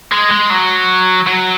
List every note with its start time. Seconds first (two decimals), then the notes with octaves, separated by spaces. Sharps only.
0.12 G#3
0.31 G#3
0.50 F#3
1.27 F#3